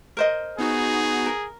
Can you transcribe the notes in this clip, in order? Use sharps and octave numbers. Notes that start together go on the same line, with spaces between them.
A#4 C5 D#5
B3 D#4 F#4 G#4
A#4